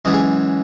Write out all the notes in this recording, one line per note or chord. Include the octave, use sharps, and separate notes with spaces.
F#2 E3 G#3 D#5
G#4